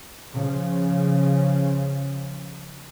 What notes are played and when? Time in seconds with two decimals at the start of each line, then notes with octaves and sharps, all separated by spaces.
0.33 C#3 F3